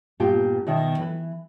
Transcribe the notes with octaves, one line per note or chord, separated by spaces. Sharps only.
G2 A#2 B3 F4 G4 G5
B2 D#3 E5
E3 B4